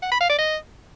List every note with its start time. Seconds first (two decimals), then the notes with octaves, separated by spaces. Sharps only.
0.02 F#5
0.12 B5
0.21 F5
0.30 D5
0.39 D#5